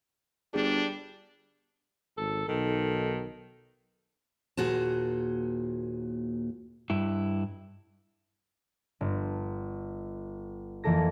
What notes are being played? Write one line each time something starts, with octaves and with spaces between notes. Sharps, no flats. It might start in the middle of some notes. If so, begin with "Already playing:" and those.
G1 G3 D4 G#4
G#1 A4
B1 D#3 A4
D#2 A#2 F#4 G#4 C5 A5
G2 E4
G1
F2 E3 A#3 A4 A#6